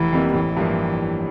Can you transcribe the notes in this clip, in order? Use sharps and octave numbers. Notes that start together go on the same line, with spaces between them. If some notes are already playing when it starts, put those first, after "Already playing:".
Already playing: F1 E3
F2 C3 G3 A#3
A1 E3
G2 F3 A#3 E4